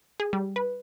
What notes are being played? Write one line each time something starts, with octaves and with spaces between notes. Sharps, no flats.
G#4
G3
B4